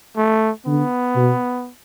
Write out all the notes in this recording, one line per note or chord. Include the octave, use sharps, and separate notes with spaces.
A3
D3 B3
B2